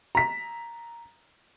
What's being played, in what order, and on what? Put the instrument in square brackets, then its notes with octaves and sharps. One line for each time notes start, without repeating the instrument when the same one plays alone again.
[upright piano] A#5 B6